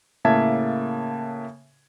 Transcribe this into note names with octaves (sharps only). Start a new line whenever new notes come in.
A2 C#3 A#3 E5 A5 G#6